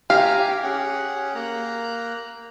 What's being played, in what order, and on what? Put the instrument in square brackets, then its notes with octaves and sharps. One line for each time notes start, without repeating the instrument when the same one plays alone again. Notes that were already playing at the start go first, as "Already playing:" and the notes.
[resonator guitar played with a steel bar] G4 [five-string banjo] F5 [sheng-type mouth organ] G#5 A#5
[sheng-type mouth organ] C#4 G#4 F#5
A#3 A#5 F#6